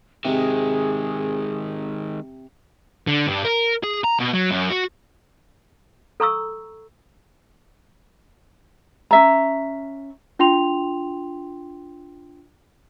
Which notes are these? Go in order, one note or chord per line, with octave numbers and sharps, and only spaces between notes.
C3 D#3 G#3 G#4
D3
G2
A#4
G#4
A#5
B2
F#3
F#2
F#4
A4 A#5 C#6 E6
C#4 E5 A#5
D4 F4 G5 C6 F7